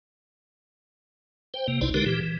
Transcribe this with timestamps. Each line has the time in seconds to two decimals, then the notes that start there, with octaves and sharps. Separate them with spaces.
1.54 C5 G5
1.68 C3 A#3
1.81 C2 C3 D#4 E4 C5 D5
1.94 D3 G#3 D#4 G4 A#4 B4
2.06 A#2 E3 G4
2.21 E3